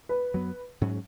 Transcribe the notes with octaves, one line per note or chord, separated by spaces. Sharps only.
B4
F#2 F#3 B3
G#2 F#3 C#4